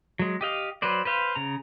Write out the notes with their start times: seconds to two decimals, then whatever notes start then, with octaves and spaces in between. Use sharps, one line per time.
0.19 F#3 G#3
0.41 G4 D#5 F5
0.82 F#3 B4 C5 D5
1.05 B4 C5 F5
1.35 C#3 A#5